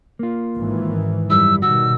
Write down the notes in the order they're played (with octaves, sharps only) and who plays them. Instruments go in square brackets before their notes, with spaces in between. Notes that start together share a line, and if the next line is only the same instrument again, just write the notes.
[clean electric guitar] A#3 F4
[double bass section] G#1 D#3 E3
[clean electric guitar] F#2 G3 E4 [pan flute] E6
[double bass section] B2 D#3 G3 [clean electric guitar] F#4 [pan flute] E6